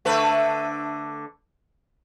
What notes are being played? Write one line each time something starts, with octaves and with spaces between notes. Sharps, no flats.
D3 A3 B4